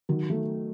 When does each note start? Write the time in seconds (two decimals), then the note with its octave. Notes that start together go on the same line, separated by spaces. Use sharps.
0.09 D#3 F#3
0.30 F#3 A3